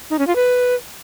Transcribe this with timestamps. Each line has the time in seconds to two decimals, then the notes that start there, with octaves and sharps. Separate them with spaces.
0.10 D#4
0.19 C#4
0.27 F4
0.36 B4